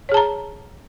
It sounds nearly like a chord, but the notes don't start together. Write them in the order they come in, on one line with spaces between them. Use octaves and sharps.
C#5 G#4 A5 A#5